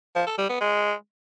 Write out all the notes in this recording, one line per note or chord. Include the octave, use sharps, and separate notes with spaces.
F3
A4
G3
B3
G#3